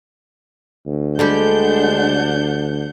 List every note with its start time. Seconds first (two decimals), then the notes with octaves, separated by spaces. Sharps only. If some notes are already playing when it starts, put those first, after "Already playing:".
0.86 D2
1.19 D3 G3 G#3 D4 G4 F#5 G6